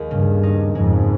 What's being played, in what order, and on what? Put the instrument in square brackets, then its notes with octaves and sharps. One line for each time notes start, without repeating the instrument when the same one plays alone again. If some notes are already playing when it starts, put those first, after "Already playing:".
Already playing: [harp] D#2 G#3
[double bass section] G2 [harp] C#3
[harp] D#4
[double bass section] F2 G#2 [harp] G#3